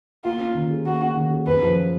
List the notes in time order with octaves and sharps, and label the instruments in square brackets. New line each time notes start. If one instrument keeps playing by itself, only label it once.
[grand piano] A#3 [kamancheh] F4
[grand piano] C#4
D#3
G#4
[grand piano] A#3 [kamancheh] F#4
[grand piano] C#4
D#3
G#4
[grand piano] F#2 [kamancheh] B4
[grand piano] F3